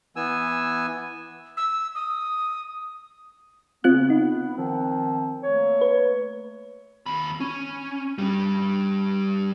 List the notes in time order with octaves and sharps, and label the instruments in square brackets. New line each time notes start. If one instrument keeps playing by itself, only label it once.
[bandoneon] E3 B3 G#5 E6
[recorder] E6
D#6
[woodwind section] C#3 B3 [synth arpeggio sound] C4 F4 F#6
[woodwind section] B3 [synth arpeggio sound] D#4
[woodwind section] D#3 F3 C4
A3 A#3 C#5
[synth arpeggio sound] B4
[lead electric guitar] D#2 B5
C#4
G2 G3